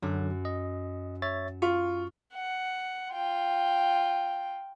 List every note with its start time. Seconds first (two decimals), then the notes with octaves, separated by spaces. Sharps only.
0.03 F#2 D3 F#3 F#6
0.45 D#5
1.22 C#5 E5 A6
1.62 F4 C#6
2.34 F#5
3.13 F4 G5